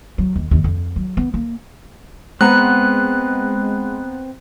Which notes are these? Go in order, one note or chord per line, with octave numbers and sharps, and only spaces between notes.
F#3
D#2
D#2
F2
F#3
B3
A#3
G#3 B3 C4 B4 C5 F#5 A#5 F#6